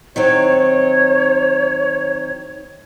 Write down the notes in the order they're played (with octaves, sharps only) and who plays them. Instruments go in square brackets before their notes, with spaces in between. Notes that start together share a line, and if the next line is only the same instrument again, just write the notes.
[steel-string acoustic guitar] D#3 F#3 C4 [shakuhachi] C#5